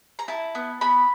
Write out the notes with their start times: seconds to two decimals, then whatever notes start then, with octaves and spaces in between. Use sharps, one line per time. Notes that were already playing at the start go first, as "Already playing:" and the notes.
0.19 A#5
0.28 E4 A5
0.55 B3
0.81 B3 B5